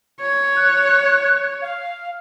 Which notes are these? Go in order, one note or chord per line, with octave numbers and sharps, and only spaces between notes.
C#5
F#6
F5